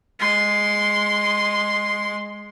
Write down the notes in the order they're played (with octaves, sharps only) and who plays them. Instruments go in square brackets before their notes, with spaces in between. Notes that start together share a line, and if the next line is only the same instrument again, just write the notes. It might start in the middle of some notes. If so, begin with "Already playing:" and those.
[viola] G#3 C6